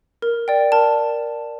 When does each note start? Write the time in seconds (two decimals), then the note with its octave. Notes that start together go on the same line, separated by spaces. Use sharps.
0.22 A#4
0.48 D5 G5
0.72 A#4 A5